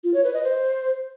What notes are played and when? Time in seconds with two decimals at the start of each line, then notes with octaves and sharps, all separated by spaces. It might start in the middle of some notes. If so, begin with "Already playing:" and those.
0.04 F4
0.14 C#5
0.24 B4
0.34 D#5
0.44 C5